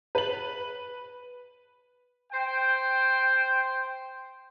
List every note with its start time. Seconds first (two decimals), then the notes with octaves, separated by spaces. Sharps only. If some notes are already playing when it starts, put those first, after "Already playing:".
0.15 B4 F#7
2.32 C5 G5